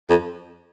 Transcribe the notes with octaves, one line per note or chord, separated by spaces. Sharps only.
F2